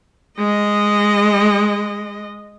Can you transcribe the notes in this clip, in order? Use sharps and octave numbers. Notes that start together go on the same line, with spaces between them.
G#3 D#5